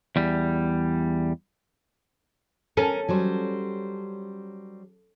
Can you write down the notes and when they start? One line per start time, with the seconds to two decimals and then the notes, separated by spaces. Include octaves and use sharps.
0.16 E2 G3
2.77 C#4 A4 A#4
3.09 F#3 G3 C5